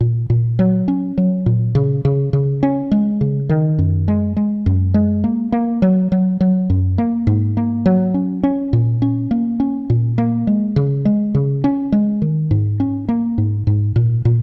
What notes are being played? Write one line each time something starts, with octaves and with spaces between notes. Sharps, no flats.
A#2
A#2
F#3
C#4
F#3
A#2
C#3
C#3
C#3
C#4
G#3
C#3
D#3
F#2
G#3
G#3
F#2
G#3
A#3
A#3
F#3
F#3
F#3
F#2
A#3
G#2
A#3
F#3
C#4
C#4
A#2
C#4
A#3
C#4
A#2
A#3
G#3
C#3
G#3
C#3
C#4
G#3
D#3
G#2
C#4
A#3
G#2
G#2
A#2
A#2